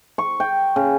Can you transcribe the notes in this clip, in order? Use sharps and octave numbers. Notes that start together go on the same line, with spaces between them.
C#6
G5
C#3